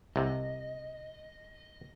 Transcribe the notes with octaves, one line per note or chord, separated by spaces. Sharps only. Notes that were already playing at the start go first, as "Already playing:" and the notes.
C2 C3 D#5